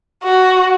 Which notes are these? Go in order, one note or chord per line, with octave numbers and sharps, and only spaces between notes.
F#4